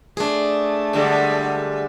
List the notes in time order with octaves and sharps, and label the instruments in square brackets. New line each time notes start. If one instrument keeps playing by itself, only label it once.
[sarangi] A3 [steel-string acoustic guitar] D4 G#4
[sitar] D3 G3 G#3